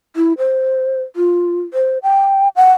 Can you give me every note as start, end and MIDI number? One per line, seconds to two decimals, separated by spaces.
0.16 0.33 64
0.38 1.02 72
1.16 1.62 65
1.74 1.98 72
2.03 2.48 79
2.56 2.72 78